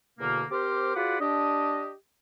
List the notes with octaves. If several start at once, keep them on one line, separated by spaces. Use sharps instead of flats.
E2 B2 D3 A#3
C4 G4 A#4 C5 D6 F6
F4 F#4 G#4 B4 D5 F#5
D4 G4 D#5